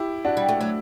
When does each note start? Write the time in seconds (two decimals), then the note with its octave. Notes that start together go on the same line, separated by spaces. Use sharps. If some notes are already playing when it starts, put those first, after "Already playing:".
Already playing: E4 G4
0.25 D4 F#4
0.37 G3
0.49 A3
0.61 F#3